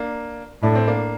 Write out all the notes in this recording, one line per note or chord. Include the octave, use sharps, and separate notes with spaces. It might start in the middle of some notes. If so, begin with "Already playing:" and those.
Already playing: A#3 D4
A2 D4
C4
A#3 D4